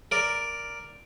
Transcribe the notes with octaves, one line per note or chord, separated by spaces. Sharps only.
A#4 D5